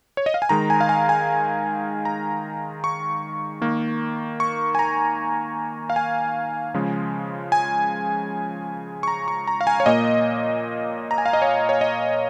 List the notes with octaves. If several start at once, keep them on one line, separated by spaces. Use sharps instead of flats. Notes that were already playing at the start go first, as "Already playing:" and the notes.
C#5
D#5
F5
G#5
D#3 G#3 A#5
G#5
F5
G#5
G#5
A#5
C#6
D#3 A#3
C#6
G#5
A#5
F5
G#5
C#3 F3 G#3
G#5
C#6
A#5
C#6
A#5
F5
G#5
C#5
A#2 A#3 D#5
A#5
G#5
F5
D#5
C#5
C#5
D#5